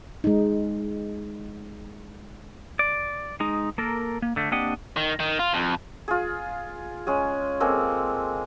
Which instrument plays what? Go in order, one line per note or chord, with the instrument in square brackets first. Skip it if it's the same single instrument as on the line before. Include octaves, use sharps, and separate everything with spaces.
[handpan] G#3 D#4
[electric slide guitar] D5
G#3 D#4
A#3 A4 A#4
A#3
D3 A3
A#3 C4 D4 G4 D#5 F#5
[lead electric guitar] D#3
D#3
F4
F2
[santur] F4 G#4
G#3 C#4 G#4
G#3 A#3 C4 A4